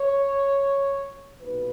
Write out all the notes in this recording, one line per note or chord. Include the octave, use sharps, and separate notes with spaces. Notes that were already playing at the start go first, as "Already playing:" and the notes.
Already playing: C#5
B1 A#2 B4